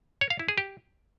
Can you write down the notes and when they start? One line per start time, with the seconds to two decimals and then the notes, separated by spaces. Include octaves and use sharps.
0.21 C#5
0.30 F5
0.39 E4
0.48 G#4
0.58 G4